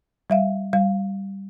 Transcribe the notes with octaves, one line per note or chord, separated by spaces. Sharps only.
G3 E5 F5
G3 F5